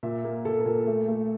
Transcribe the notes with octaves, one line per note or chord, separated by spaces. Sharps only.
A#2 E5
A#3
A#2 A4
A#4
A#2 A4
A3
A3